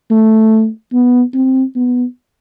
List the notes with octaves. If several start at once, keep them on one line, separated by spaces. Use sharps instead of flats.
A3
B3
C4
B3